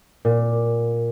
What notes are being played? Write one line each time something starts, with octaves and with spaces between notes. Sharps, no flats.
A#2